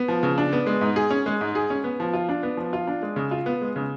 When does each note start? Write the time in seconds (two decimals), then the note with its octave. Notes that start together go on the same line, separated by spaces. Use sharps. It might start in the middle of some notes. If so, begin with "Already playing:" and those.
Already playing: B3
0.08 F3
0.23 C#3
0.38 D4
0.53 B3
0.66 G#3
0.81 G#2
0.96 G#4
1.10 C#4
1.26 G#3
1.41 G#2
1.55 G#4
1.70 C#4
1.84 B3
2.00 F3
2.13 F4
2.29 D4
2.43 B3
2.57 F3
2.73 F4
2.88 D4
3.02 G#3
3.16 C#3
3.31 F4
3.46 B3
3.61 G#3
3.76 C#3